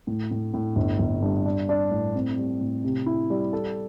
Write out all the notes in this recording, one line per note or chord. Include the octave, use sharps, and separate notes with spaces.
A2
A2
A2
G1
G1
G2
D4
D4
A2
C4
G3
A2
C3
E4
G3
A4